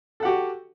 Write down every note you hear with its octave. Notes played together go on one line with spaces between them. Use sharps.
F#4 G4 A4 F#5